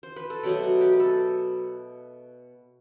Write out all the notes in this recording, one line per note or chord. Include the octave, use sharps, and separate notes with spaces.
C5
B4
A4
B2 F#3 A3 G4
F#4
G4
B4
A4